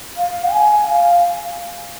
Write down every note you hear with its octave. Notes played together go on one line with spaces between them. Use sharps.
F5
G#5
F5